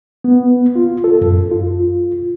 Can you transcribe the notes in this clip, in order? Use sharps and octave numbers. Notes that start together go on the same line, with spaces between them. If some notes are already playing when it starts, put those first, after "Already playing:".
B3
F4
A4
F#2
F4